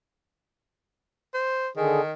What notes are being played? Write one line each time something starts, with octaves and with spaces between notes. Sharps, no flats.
C5
D3 D#3 G#4